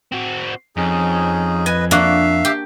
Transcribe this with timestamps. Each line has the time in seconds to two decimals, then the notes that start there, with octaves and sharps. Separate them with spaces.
0.12 C4 F#4
0.77 F2 C#4 D#4 G#4
1.66 B4 D#5 G#5
1.91 A#3 D4 F#4 E5 F5
2.45 G4